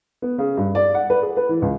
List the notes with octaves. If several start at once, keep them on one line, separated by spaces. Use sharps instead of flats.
B3
C#3
G2
D5
F#5
B4
G#4
B4
E3
C#2